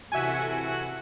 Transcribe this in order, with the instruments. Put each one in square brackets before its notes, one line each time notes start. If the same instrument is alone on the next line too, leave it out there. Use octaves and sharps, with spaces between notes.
[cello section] C3 E4 A4 [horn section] E3 F#4 [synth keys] E5 G#5